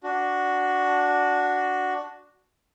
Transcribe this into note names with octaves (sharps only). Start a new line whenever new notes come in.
D4 F#4